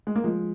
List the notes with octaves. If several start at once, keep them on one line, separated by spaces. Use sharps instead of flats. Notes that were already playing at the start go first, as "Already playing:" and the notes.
G#3
A#3
F3 G#3